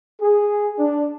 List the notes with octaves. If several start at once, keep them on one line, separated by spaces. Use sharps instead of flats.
G#4
D4